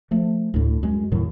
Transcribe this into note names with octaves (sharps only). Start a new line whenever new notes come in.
F3 A3
D2 A2
F#2 G#3
E2 A2 D#3 F#3